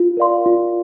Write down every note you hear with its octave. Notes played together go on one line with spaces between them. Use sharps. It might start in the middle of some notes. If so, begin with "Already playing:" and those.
Already playing: F4
A#4 D5 F5 C6
F4